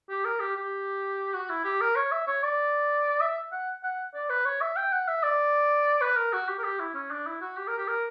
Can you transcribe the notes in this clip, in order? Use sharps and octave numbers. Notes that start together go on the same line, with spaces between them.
G4
A#4
G4
G4
F#4
E4
G4
A#4
C#5
E5
C#5
D5
E5
F#5
F#5
D5
B4
C#5
E5
G5
F#5
E5
D5
B4
A#4
F#4
G4
A#4
G4
E4
C#4
D4
E4
F#4
G4
A#4
G4
A#4